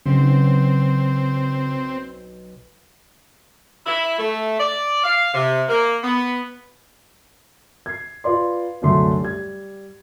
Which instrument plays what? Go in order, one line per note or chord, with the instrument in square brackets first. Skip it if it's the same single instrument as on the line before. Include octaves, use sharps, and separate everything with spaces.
[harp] B1 F#3 [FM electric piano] C#3 [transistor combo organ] C4
[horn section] E4
A3
D5
F5
C3
A#3
B3
[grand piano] G#6 C7
F4 B4 D5 C6
C2 F#2 D3 A3 C6
G3 G#6